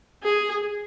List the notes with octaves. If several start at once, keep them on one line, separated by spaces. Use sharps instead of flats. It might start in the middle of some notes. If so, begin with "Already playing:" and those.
G#4